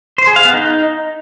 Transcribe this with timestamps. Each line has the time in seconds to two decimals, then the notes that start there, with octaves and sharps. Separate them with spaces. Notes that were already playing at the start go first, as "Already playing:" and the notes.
0.18 C5
0.27 G#4
0.36 F5
0.45 B3
0.54 D#4